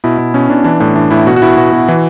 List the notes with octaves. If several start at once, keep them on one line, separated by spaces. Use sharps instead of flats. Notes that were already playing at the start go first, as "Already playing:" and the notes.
B2 E4
B2 E4
B2 C#4
B2 D4
E3 D4
A2 D4
E3 D4
A2 E4
B2 F#4
F#4
B2 E4
B2 F#4
B2
E3